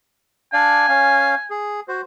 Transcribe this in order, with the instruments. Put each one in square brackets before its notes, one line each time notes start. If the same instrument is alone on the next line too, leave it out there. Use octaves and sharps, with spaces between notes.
[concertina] D4 D5 F5 [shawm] G#5
[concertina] C#4 F5
G#4
F#4 C5